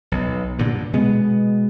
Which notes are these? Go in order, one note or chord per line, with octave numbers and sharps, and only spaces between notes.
B1
G2 A#2 D3
B2 G#3 B3